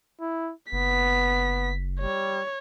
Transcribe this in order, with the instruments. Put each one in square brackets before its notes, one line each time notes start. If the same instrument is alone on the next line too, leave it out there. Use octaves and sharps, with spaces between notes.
[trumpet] E4
[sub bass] F#1 [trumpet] B3 [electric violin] B6
[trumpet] G3 [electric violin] C#5